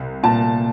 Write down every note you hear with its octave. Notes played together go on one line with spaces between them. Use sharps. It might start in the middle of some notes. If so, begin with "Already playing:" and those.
Already playing: C2
A#2 A5